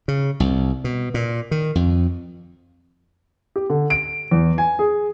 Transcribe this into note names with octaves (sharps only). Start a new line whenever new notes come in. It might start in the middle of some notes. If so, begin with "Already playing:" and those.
C#3
C2
B2
A#2
D#3
F2
G4
D3
D7
E2
G#5
G#4